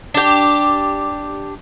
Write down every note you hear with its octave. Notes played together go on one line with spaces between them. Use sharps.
D4 G4